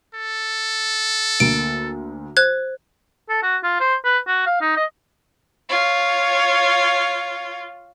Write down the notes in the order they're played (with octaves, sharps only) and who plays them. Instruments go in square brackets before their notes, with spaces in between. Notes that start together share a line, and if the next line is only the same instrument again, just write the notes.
[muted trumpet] A4
[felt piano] D2 A#3 [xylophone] D7
[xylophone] C5 F#6 G#6
[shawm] A4
F#4
F4
C5
B4
F#4
F5
D#4
D#5
[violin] F4 C#5